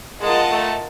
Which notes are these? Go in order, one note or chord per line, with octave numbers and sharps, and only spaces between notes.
G#3 F4 A#4 D#5 F#5 A5
A3